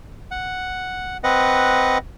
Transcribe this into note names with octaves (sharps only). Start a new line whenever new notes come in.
F#5
C4 B4 D#5 F#5